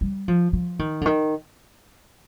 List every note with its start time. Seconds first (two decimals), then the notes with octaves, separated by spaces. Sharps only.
0.01 G3
0.28 F3
0.53 F3
0.79 D#3
1.01 D3
1.06 D#3